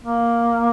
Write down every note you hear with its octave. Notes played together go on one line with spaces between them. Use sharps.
A#3